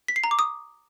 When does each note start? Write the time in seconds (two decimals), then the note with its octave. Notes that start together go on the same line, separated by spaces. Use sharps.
0.08 B6
0.16 C7
0.24 A#5
0.31 D6
0.39 D#6